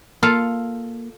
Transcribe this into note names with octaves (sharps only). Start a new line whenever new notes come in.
A#3 F4 A4 F5